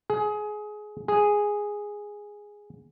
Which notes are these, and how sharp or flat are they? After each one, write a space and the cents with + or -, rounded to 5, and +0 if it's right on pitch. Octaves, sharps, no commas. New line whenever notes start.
G#4 +20
G#4 -5